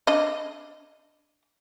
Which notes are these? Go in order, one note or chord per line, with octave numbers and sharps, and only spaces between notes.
D4 D#5